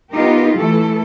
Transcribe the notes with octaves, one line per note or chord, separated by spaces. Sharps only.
B3 D#4 F4 G4 A#4
E3 A3 A4